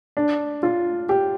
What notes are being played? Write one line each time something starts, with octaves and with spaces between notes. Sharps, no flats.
D4
F4
G4